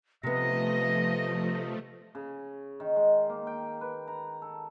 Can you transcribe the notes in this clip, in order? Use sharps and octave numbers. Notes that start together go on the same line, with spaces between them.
C3 F3 A3 B3 D#5 A#6
C#3
D#3
G#3
A#3
G5
B4
A#5
A4